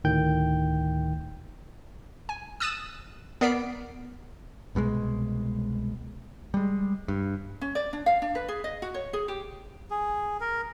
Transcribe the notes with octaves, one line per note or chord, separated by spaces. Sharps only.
D2 A2 D#3 G5 G6
G#5
D#6 E6 F#6 A6 D#7 E7
B3 A#4 D5 B6 C7 D7
C2 B2 G3 G#3
G3 G#3
G2
C#4
D5
D4
F5
D4
B4
G#4
D#5
F#4
C#5
G#4
G4
G#4
A#4